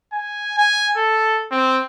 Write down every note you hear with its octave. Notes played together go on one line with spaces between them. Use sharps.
G#5
G#5
A4
C4